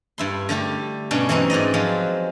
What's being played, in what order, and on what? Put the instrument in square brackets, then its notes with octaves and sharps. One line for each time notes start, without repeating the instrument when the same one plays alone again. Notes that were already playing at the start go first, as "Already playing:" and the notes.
[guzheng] G2 E4 C6
D3 G3 A3 G4
G2 B2 C#4 D4
E3 F#3 C4 C#4 D#4
G#2 F#4 D5 D#5
F3 F#3 G#3 C6